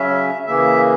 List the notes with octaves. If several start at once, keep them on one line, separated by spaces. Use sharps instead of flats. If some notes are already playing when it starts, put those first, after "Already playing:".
Already playing: C#3 F#3 C#4 E5
C#3 E3 A#3 E5